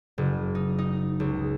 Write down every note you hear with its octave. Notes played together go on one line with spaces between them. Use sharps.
F#1
D#4
D#4
C#2